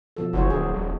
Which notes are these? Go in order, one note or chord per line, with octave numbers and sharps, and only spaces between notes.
B2 F3 A4
F#1 F#4 C5 C#5
D1 G#4
D#1